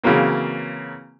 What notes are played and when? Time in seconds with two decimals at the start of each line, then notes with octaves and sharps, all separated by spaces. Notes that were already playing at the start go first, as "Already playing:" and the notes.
0.03 C#3 E3 F#3 A#3 C4